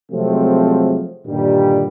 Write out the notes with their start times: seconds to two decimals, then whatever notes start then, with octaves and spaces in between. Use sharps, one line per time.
0.11 C3 F3 F#3 G#3 A3 C4
1.26 G2 A#2 D3 D#3 G3